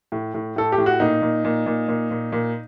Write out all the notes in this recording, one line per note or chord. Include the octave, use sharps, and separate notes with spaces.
A2
A2
A2 A4
G4
A2
F#4
A#2 D#4
A#2
A#2
A#2
A#2
A#2
A#2